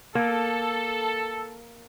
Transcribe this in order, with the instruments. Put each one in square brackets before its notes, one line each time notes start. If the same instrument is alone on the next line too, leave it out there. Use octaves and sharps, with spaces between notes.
[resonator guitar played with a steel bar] A#3 [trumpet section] A4